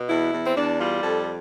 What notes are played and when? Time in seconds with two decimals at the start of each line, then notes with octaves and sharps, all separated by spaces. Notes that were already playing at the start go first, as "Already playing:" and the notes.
Already playing: B2
0.08 E2 E4
0.32 E2
0.46 C4
0.55 E2 D4
0.79 G3 F4
1.03 F2 A4